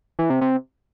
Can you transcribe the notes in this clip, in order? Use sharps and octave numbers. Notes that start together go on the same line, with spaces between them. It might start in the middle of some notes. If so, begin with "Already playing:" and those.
E3
C3
C3